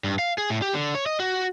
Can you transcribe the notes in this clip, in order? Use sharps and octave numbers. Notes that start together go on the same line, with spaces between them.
G2
F5
G#4
A2
G4
D3
C#5
D#5
F#4